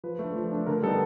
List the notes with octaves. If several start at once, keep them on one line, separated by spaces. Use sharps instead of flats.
F3 B4
A3
D4
F3
A3 D4
D3 A#4
G3 B3 D#4 A4